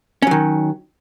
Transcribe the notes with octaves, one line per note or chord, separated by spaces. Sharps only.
D#3 F#3 C#4